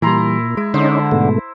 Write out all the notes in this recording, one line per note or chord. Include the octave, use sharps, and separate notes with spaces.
A#2 E3 G3 E4 A#5 C6
G#3 E4
D3 C#4 D#4 C5
G#2 B2 A3